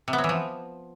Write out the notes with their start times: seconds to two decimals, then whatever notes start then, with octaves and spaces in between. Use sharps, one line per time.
0.08 C3
0.13 B3
0.18 F#3
0.24 E3
0.29 F3